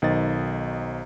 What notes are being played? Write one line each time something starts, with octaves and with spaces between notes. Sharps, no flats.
B1 D#3 C5 D#5 A6